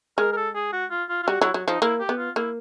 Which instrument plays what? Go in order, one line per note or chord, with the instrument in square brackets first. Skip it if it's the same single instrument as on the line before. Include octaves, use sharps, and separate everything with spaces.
[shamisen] G#3 [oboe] A#4
[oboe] A#4
A4
G#4
F#4
F4
F4
F4
[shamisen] G3 [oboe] F#4
[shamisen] F#3 [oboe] E4
[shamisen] F#3
[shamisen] F3 [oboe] D#4
[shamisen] A#3 [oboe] E4
[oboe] G4
[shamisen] B3
[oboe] F4
[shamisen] A#3 [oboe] E4